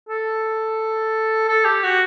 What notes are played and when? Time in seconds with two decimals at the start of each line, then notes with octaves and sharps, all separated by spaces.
0.09 A4
1.48 A4
1.65 G4
1.83 F#4